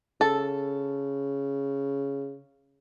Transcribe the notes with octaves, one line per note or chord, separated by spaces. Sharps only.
C#3 A4